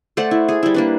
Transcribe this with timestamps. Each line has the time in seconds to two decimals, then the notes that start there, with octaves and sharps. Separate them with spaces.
0.17 A3 C5 D5 F#5
0.31 E4
0.49 G#4
0.63 G3 E4
0.74 A#3 D4 B4